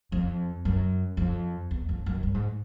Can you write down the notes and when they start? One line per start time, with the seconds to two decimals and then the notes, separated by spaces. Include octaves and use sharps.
0.12 F2
0.65 F#2
1.17 F2
1.71 E2
1.89 F2
2.06 F#2
2.23 G2
2.34 G#2